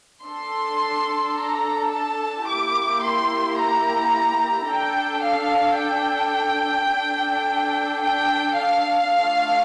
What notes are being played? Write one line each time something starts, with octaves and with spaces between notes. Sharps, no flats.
D4 A4 C6
A#5
A5
A#3 E4 G4 D6
C6
A#5
D4 A4 G5
F5
G5
D4 A4
G5
F5
A3 D4 F4 A4